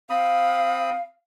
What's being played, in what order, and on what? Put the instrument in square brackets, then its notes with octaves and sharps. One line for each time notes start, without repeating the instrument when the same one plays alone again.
[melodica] C4 B5 D#6 [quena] F5